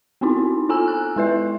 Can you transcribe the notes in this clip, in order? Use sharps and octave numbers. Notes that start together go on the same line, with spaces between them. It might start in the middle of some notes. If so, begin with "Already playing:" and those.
B3 C4 D#4 E4 F#4
F4 A4 G#5 A#5 E6
F#6
G#3 E4 B4 E5